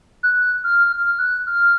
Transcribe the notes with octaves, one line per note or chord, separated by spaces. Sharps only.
F#6
F6
F6
F#6
F6